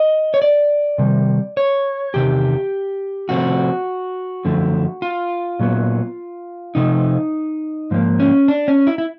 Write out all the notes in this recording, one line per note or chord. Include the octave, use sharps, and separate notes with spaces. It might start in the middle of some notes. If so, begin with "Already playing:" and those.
Already playing: D#5
C#5
D5
C3 D#3 G3
C#5
E2 C3 D#3 G4
C3 F3 A3 C4 F#4
F#2 D3 F3 A3
F4
A#2 F#3 B3
C3 F3 A3 D#4
G#2 F3 A#3
C#4
D4
C#4
E4
E4